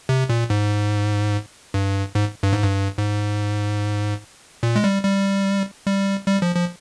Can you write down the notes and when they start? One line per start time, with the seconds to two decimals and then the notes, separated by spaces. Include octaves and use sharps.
0.09 C3
0.29 A#2
0.50 G#2
1.74 G2
2.15 G#2
2.43 G2
2.53 G#2
2.64 G2
2.98 G#2
4.63 A#2
4.76 G#3
4.84 G3
5.04 G3
5.86 G3
6.28 G3
6.42 F3
6.55 F3